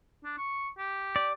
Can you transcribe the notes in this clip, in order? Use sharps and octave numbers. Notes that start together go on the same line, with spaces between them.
D4
C#6
G4
D5